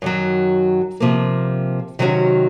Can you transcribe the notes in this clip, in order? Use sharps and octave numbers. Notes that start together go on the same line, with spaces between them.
F#2 D#3 F#3
C3 F3 A#3
C3 D#3 F#3 C#4 F#4